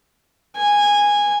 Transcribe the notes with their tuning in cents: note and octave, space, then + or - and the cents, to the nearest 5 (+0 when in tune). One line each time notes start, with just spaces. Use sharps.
G#5 -10